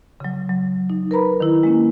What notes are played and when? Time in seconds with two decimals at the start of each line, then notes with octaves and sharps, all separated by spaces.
0.20 C#3 F#3
0.49 F#3
0.90 D#4
1.11 A#4 B4 A#5 B5
1.40 D#3 E4
1.63 G#3 A#3 C#4